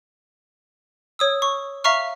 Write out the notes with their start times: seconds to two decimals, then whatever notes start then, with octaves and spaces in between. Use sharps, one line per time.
1.19 C#5 D#6 E6
1.42 C#6
1.84 E5 F5 A#5 C#6 F6